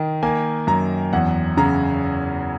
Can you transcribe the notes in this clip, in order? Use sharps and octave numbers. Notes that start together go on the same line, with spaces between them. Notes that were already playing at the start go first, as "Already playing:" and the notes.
Already playing: D#3
A#3 G#5
F#2 A#5
E2 F#5
C#3 A#5